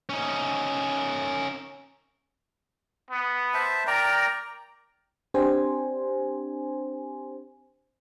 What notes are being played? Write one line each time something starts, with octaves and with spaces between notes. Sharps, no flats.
C#4 D#4
B3
C5 E5 A5
A#4 D5 G5 A#5
C4 D4 G4 C5 G#5